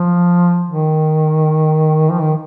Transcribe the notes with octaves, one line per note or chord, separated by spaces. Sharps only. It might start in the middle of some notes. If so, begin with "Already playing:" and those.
Already playing: F3
D#3
F3
D#3